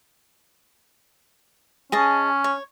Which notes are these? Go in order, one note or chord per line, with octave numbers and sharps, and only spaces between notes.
C#4 G#4 D#5 A5
C#5